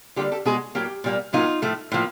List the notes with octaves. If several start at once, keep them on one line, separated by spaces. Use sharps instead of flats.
D3 G3 A#3 F4 G4
G4 A4
B2 G#3 F#4 G#4
A2 F#3 A#3 G4
A#2 G3 A#3
A2 F#3 A#3 D#4 F4
A2 F3 A3
A2 F3 A#3